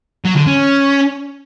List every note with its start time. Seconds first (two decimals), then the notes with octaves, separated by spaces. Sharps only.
0.25 F#3
0.36 D3
0.47 C#4